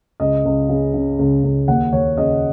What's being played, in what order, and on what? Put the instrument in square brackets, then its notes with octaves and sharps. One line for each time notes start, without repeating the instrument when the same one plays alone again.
[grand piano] C#2 D#5
C#2
C#3
C#3
C#2
C#2
D#2 F#5
D#2 C#5
C#3 D#5